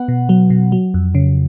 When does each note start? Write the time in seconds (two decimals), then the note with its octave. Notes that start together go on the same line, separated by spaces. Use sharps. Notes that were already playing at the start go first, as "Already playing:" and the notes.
Already playing: B3 F#5
0.08 B2
0.29 F#3
0.50 B2
0.72 F#3
0.94 F2
1.15 C#3